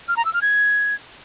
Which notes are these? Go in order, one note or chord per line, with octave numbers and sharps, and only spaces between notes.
F6
A#5
E6
F6
G#6